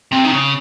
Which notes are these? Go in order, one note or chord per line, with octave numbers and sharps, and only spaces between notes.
C3
D#3
C#3